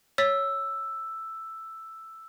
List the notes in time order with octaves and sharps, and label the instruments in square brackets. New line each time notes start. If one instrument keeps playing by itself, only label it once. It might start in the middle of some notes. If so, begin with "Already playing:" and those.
[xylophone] C#5 A6 B6 [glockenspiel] E6